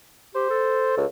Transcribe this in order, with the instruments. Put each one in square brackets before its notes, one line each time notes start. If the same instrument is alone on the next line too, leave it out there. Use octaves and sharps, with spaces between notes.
[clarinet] G4 [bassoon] C5
[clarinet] A4
[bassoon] C#2